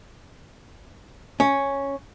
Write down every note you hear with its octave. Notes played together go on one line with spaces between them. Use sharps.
C#4